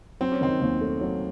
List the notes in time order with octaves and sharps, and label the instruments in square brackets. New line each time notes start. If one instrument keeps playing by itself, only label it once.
[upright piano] F#3 [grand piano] C4
[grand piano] C#4
[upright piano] D#3 [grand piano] C4
[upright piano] D#2
A3
F#3